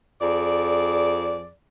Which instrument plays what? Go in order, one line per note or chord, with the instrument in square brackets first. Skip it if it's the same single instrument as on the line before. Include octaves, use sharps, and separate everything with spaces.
[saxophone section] F2 G#4 D5